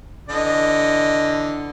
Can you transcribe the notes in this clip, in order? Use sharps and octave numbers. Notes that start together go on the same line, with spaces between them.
D3 E3 D#5